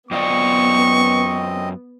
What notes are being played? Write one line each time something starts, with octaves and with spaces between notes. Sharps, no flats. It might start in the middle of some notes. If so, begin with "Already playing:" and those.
F#2 B3 C4 F4 D5 D#5 C#6